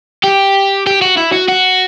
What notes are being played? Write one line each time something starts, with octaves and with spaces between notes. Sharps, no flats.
G4
G4
F#4
E4
F#4
F#4